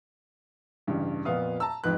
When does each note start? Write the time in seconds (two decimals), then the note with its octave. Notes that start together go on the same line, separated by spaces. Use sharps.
0.87 A1 G2 C#3
1.25 F2 A#2 B3 F5 D#6
1.60 A5 A#5 E6
1.84 F2 G#2 B4 F#6